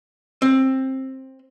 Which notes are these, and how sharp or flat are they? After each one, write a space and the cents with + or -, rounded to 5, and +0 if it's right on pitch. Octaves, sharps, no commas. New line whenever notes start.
C4 +15